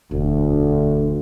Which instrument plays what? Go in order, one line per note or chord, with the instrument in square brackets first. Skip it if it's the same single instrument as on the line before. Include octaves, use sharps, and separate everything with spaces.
[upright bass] E1 [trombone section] D2